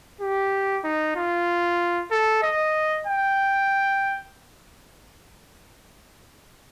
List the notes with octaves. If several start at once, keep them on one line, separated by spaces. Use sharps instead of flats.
G4
D#4
F4
A4
D#5
G5